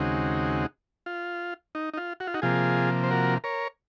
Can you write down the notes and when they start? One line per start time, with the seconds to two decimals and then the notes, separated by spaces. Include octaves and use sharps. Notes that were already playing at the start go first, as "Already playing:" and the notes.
Already playing: D#2 C#3 G#3 C4 D#4 F#4
1.06 F4
1.75 D#4
1.94 D#4
1.98 F4
2.20 F#4
2.27 F4
2.34 D#4 F#4
2.42 C3 F3 A#3 F4 G#4
3.04 C5
3.11 F#4 A#4
3.44 A#4 C#5